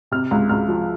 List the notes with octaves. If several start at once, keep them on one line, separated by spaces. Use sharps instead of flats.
C3 F6
C#2
C#2 F6
F3